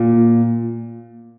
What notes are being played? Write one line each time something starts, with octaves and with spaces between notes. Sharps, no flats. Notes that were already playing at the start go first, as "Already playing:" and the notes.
Already playing: A#2